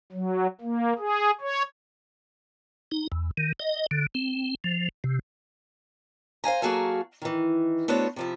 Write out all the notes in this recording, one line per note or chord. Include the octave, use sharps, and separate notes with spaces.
F#3
A#3
G#4
C#5
D#4
E2
D#3
D#5
D3
C4
F3
C3
C5 F5 G#5 A#5
F#3 A#3 F#4 G#4 A4 F5
D#3 E3
A3 B3 D4 F#4 C5 C#5
C3 F3 E4